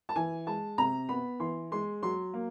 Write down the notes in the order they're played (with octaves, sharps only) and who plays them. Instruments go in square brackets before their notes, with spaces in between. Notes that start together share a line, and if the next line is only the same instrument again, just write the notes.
[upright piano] A5
E3 G#5
G#3 A5
C3 A#5
B3 B5
E3 C6
G#3 C6
F#3 C6
A#3